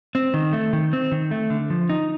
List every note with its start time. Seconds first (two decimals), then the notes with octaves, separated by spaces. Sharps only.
0.15 C4
0.34 D#3
0.53 A3
0.73 D#3
0.93 C4
1.12 D#3
1.31 A3
1.50 D3
1.70 F3
1.89 D#4